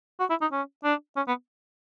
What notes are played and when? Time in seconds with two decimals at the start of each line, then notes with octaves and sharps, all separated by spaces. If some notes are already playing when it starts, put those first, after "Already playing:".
0.20 F#4
0.30 E4
0.42 D#4
0.52 C#4
0.84 D4
1.16 C#4
1.28 B3